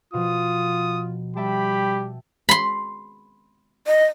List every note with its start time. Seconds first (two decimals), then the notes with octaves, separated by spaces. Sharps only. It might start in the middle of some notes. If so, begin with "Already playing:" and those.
0.14 B2 F3 F4 D#6
1.37 G3 G4 E5 G5 A5 B5
2.49 B5 C6
3.87 D#5